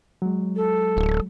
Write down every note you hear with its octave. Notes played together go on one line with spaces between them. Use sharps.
F#3 G#3
A4
D1